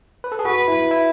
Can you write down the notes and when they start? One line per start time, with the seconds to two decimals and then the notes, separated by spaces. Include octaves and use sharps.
0.24 B4
0.32 A4
0.39 G#4
0.45 F#4 B4
0.68 E4
0.91 E4